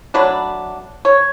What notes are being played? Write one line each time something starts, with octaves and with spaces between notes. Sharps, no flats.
F#3 A3 D4 B4
C#5